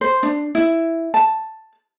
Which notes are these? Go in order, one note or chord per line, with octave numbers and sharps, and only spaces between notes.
C5
D4
E4
A5